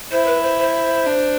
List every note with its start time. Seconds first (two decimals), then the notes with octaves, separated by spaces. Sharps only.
0.11 E4 C5
0.26 B4
0.42 C5
0.58 C5
1.06 D4